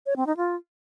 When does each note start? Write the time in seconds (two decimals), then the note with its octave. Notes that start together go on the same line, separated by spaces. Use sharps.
0.06 C#5
0.16 C4
0.27 D#4
0.37 F4